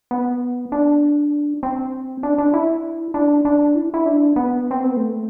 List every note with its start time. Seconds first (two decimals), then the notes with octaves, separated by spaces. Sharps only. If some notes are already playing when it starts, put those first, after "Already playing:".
0.11 B3
0.72 D4
1.63 C4
2.23 D4
2.38 D4
2.54 E4
3.14 D4
3.45 D4
3.75 E4
3.94 E4
4.06 D4
4.36 B3
4.71 C4
4.84 B3
4.97 A3